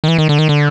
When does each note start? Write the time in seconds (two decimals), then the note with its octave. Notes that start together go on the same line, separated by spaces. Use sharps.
0.04 D#3
0.08 E3
0.18 D#3
0.29 D3
0.39 D#3
0.49 D3